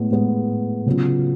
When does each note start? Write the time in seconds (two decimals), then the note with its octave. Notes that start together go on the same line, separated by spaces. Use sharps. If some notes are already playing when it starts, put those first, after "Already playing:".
Already playing: A2 G#3 B3
0.11 A2 G#3 B3
0.86 C#3 F#3 B3 F4